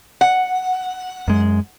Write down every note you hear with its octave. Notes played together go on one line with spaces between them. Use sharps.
F#5
F#2 G#3